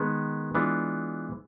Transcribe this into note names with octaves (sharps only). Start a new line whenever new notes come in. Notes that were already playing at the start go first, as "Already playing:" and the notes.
Already playing: D#3 G#3 B3
E3 G#3 B3 D4 F4